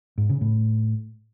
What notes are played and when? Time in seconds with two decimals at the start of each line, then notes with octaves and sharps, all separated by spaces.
0.18 G#2
0.29 C#3
0.41 A2